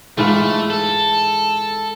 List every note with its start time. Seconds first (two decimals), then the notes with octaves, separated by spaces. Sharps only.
0.18 G#2 E3 A3 F4
0.70 A4